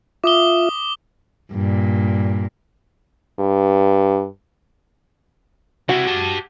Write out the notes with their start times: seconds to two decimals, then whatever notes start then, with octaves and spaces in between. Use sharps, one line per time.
0.24 F4 E5 D6 D#6 G7
1.52 G2 A#2
3.39 G2
5.89 C3 E4 F#4
6.07 G4 A5